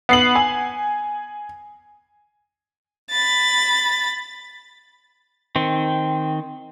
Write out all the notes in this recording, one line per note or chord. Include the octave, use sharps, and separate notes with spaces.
B3 C7 F#7
G#5
B5 A6
D#3 C4